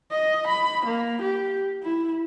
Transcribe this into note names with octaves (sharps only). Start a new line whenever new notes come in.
D#5
B5
A#3
G4
E4